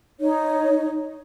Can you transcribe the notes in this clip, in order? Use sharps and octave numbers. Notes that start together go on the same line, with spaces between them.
D#4 C#5